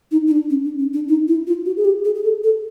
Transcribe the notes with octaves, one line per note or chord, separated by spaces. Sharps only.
D#4
D#4
D4
C#4
D4
C#4
D4
D#4
E4
F4
F#4
G#4
G4
G#4
G#4
A4
A4